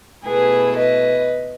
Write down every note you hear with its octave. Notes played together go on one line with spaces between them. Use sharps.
B2 A3 E4 G#4 B4
B4 D#5